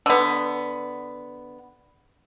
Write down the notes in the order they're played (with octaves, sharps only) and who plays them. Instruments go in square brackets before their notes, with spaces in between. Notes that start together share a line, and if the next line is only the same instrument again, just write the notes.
[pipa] D3 B3